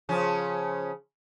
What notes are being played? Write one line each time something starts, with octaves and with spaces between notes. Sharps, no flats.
C#3 F3 C#4